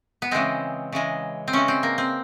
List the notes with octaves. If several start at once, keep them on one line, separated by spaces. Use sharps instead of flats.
B3
C#3 E3 G#3 C4
C#3 E3 G#3
C4
C#3 E3 G#3 C#4
C4
A#3
C4